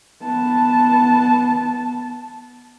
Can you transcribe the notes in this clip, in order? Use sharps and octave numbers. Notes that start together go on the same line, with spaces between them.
B3 A5